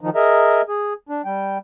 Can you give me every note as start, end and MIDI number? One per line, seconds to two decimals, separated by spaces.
0.01 0.10 51
0.01 0.10 53
0.01 0.10 63
0.15 0.62 68
0.15 0.62 70
0.15 0.62 75
0.15 0.62 76
0.15 0.62 82
0.68 0.93 68
1.09 1.22 62
1.25 1.58 55
1.25 1.58 79